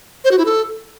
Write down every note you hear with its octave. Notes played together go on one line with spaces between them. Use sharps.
C5
F#4
E4
A4